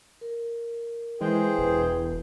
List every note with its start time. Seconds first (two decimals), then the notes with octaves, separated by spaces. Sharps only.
0.21 A#4
1.21 E3 G#3 G#4 C5 G5
1.58 E1 B4